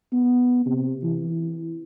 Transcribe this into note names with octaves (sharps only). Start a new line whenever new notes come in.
B3
C3
E3